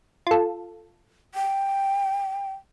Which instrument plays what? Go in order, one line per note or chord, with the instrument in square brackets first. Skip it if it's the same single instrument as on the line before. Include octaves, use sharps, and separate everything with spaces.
[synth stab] F4 A4
[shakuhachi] G5